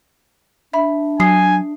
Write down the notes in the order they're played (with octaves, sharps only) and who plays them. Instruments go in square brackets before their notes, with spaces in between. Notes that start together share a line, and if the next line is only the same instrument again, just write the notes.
[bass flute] D4 [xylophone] E5 B5
[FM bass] F#3 [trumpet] G#5 [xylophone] D#6 C7